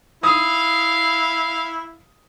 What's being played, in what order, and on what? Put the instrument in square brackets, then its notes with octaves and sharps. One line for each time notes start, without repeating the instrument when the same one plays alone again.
[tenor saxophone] E4 [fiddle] F5 [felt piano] D#6